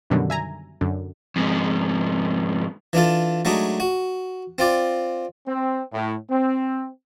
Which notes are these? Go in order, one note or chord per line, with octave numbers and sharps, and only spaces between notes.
F#2 B2 D3 D#3 F#3 G3
E5 G#5 A#5
F#2 D3
F2 G#2
E3 D4 F4 A4
F#3 G#3 A3 D4 D#4
F#4
C4 F4 D5
C4
A2
C4